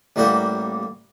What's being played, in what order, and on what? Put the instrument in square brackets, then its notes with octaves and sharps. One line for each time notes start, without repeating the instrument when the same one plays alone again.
[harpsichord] A1 G3 A#3 F#4 G5